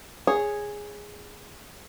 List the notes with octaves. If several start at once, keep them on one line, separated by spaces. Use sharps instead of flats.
G#4 C#5